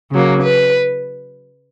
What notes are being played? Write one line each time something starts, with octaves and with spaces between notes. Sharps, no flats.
C#3 F#3 A#3
B4